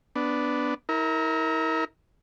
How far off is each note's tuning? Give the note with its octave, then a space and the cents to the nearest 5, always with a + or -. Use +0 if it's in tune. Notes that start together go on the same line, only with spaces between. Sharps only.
B3 +0 D4 -5
E4 -40 A#4 +0